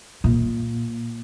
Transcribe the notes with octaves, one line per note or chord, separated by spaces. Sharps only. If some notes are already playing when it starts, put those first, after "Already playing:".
A#2